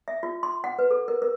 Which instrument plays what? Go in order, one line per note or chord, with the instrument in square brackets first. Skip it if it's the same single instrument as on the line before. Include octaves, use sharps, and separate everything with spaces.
[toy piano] E5
F4
C6
F#5
B4
A4
A#4
A#4